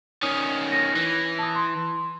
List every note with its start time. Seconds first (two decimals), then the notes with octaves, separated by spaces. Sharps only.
0.23 D#3 C#4 D#6
0.72 A#6
0.96 E3
1.39 A5 D#6
1.55 C6